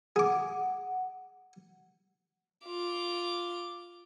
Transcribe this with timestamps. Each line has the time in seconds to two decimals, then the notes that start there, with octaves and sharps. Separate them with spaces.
0.16 G#4 F#5 D6
2.66 F4 D6